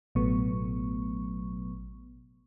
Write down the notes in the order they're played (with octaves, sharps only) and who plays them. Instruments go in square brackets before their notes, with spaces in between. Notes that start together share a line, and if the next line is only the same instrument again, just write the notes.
[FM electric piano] A1 B2 F#3 A3 B3 C#6